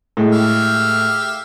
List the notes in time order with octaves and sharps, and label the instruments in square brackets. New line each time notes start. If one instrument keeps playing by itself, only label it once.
[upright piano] A2 G#3
[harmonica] G4 E5 F5